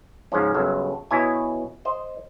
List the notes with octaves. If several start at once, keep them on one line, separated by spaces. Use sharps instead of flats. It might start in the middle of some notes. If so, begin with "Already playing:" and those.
G#2 C#3 F3 C#4
G1 C#3 F#3 A4
B2 E4 C#5 D#5 G#5
C5 D#5